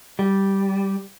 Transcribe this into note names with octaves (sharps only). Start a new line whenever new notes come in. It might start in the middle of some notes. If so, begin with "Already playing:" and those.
G3